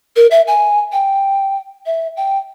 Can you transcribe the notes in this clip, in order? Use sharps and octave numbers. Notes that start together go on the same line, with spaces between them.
A#4
E5
G#5
G5
E5
G5